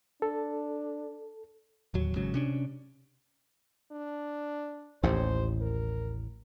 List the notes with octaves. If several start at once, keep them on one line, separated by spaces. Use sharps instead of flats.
D4 A4
D1 D#2 F#3
G#1 G#2 C#3 F#3
C3 C#4 D4
D4
A1 D#2 A2 C5
A#4